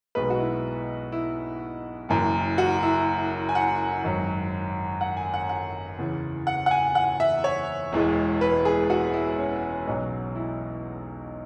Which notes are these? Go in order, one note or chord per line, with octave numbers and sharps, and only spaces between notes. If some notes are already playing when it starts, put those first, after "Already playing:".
B1 B2 G#3 B4
F#4
E4
E4
F#1 F#2 E3
F#4
E4
G#5
F#5
G#1 F#2 F#3
F#5
G#5
F#5
F#5
E2 C#3 E3
F#5
F#5
G#5
F#5
E5
C#5
E1 E2 E3 G#3
B4
G#4
F#4
E4
C#4
B1 B2 F#3
E4